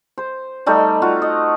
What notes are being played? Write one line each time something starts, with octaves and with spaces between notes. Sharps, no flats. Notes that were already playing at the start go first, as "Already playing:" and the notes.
C5
G3 A3 D#4
F4 F#4
D#5